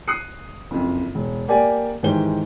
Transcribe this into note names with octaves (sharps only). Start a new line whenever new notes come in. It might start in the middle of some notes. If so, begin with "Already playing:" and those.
D#6 F#6 C7 C#7
F#1 F2
E1
A#3 G4 D5 G#5
G#2 D#3 E3 G4 C5 G7